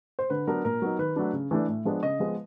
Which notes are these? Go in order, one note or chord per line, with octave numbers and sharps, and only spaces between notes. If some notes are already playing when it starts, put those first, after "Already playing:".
C5
D3 B4
F#3 B3 D4 A#4
A#2 A#4
F#3 B3 D#4
D#3 B4
F#3 A3 D4
C#3
E3 A3 D4
A2
F3 G#3 B3 D4
C#3 D#5
F3 G#3 B3